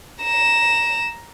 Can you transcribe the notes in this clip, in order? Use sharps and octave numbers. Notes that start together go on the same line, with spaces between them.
A#5 E7